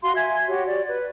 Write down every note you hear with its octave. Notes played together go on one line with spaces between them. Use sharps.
F#4 F5 C6
E5 G#5 G#6
F#4 G4 C#5
D5
B4